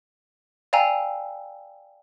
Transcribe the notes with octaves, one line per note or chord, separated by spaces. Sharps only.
D5 F5 G5 G#5 A#5 E6